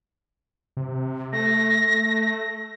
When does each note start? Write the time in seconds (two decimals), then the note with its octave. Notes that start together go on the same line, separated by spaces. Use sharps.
0.77 C3
1.33 A3 A#6